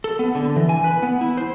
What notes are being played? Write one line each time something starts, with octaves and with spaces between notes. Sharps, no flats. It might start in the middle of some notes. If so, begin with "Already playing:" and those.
A4
B3
D3
E3
G#5
B4
B3
E4
C5